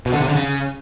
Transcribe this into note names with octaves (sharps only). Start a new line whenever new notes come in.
B2
D3
C3
D3
C#3